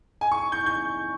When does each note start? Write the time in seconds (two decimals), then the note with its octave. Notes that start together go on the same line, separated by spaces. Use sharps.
0.21 G#5
0.32 C#6
0.52 G6
0.66 G6